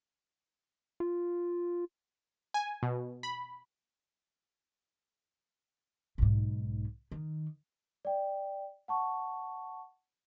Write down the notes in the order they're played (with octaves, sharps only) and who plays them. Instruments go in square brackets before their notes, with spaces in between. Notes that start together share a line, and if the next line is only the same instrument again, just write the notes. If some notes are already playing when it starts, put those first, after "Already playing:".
[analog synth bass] F4
[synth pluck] G#5
B2
B5
[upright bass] B1 G#2
D#3
[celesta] D5 G5
F#5 A5 C#6